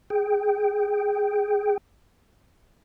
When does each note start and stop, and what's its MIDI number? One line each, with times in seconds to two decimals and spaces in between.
0.10 1.77 68
0.10 1.77 79